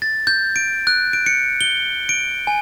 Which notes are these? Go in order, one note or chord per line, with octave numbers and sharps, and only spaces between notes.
A6
G6
D7
F#6
D7
C#7
G7
D7
G#5